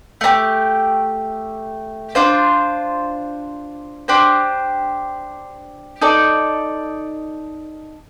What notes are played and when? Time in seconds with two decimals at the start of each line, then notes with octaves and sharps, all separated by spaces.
0.21 A3 D#4 G4
2.15 D4 F4 C5
4.08 D4 G4 C5
6.02 D#4 A4 D5